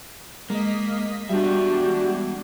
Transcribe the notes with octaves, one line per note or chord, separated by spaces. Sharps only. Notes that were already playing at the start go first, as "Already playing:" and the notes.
G#3 A#3 D#5 B6
G3 B3 D4 F#4 G4 E5